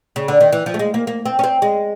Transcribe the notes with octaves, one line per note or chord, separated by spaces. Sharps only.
C#3
D3
D#3
E3
F3
A3
G#3
A#3
A#3
C4
C#4
C4
G#3